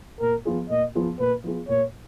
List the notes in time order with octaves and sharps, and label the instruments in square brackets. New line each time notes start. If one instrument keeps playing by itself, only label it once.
[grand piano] A#2 [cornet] A#4
[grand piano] F3 B3 F4 G#4
[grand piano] A#2 [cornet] D#5
[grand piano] F3 B3 F4 G#4
[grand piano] A#2 [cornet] B4
[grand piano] F3 B3 F4 G#4
[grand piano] A#2 [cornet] C#5